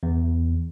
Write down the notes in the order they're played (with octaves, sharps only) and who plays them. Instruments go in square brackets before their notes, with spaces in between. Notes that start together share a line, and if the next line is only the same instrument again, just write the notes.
[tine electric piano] E2